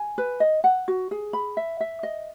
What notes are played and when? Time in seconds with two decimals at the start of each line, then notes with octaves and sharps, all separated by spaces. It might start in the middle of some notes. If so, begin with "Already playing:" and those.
Already playing: G#5
0.18 B4
0.40 D#5
0.64 F#5
0.88 F#4
1.11 G#4
1.33 B5
1.57 E5
1.80 E5
2.03 D#5